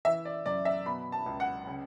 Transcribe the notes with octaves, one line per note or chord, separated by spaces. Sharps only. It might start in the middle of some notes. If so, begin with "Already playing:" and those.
E3 E5
D5
F#2 D5
E5
B2 B5
A5
C#2
F#5
C#3